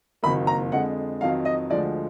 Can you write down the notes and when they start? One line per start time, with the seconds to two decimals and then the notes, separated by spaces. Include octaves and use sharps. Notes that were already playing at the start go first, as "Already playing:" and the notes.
0.23 F#1 F2 D#3 F#3 A#3 B5
0.47 A#5
0.72 F2 D3 G#3 F#5
1.21 F2 D#3 F#3 F5
1.45 D#5
1.70 D2 D3 F3 G#3 D5